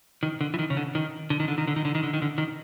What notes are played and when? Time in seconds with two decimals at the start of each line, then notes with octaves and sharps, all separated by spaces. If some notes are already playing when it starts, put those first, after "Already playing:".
0.23 D#3
0.41 D3
0.54 E3
0.59 D#3
0.70 C#3
0.77 D3
0.95 D#3
1.30 D3
1.40 D#3
1.48 D3
1.58 D#3
1.67 D3
1.76 D#3
1.85 D3
1.95 D#3
2.03 D3
2.13 D#3
2.22 D3
2.38 D#3